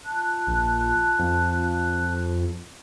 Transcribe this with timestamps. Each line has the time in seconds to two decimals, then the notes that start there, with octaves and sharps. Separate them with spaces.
0.04 F4 A5 F#6
0.47 A#1
1.19 F2